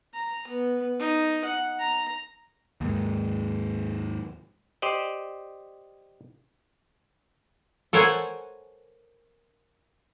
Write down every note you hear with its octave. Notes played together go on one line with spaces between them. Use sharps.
A#5
B3
D#4
F#5
A#5
D#2 G#2
G4 C5 D5 D#5
A4 A#4 C5 C#5 F#5 G#5